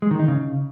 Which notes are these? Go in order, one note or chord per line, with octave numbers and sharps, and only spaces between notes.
G#3
D#3
D#4
C#3